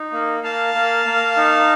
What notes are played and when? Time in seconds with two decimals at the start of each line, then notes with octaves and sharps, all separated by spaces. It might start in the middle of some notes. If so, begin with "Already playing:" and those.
Already playing: D#4
0.12 A#3
0.43 A#3 F5 A5
0.74 A#3
1.06 A#3
1.37 D#4